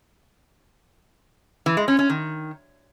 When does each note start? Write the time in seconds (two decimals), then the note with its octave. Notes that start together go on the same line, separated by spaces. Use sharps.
1.66 E3
1.77 G#3
1.88 C#4
1.99 C#4
2.10 D#3